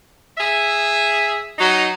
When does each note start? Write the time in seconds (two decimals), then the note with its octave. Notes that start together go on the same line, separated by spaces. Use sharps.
0.38 G#4 E5
1.59 F#3 D#4